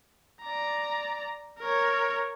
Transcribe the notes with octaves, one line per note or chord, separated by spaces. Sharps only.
D5 A#5
A#4 C#5